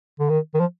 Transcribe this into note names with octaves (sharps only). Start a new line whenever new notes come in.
D3
D#3
D#3
F3